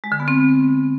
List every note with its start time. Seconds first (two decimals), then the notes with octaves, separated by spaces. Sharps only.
0.04 G#3
0.12 D3
0.20 B3
0.28 C4